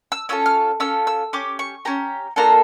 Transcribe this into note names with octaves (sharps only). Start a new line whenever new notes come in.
E6
C#4 F4 A4 E6
F6
C#4 F4 A4 E6
E6
C#4 G4 D6
C#6
C#4 G4 A#5
A#3 D4 F4 A4 A#5